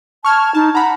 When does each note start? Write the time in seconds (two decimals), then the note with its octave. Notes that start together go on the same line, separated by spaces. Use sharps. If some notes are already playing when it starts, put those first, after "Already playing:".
0.25 A5 C#6 F6 G#6
0.55 D#4 A5
0.75 F#5 A#5 B5